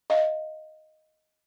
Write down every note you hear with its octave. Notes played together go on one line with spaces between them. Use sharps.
D#5 F5